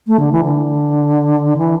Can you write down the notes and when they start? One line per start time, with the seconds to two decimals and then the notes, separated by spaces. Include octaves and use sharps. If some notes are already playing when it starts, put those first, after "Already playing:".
0.07 A3
0.19 D3
0.32 E3
0.43 D3
1.57 E3